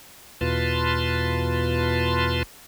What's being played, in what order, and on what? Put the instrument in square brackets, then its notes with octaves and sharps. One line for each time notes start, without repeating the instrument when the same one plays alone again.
[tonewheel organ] E2 B2 F4 B4 A5 C6